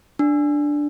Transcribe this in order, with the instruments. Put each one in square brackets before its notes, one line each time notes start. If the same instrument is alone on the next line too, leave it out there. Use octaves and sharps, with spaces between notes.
[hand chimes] D4